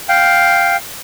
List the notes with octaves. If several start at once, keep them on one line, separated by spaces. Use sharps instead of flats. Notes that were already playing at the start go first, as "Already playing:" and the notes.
F5 G5